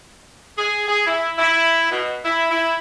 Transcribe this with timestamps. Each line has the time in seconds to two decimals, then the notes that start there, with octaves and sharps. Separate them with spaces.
0.58 G#4
0.88 G#4
1.07 E4
1.39 E4
1.90 B2
2.25 E4
2.51 E4